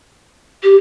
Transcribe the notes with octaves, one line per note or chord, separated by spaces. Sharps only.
G4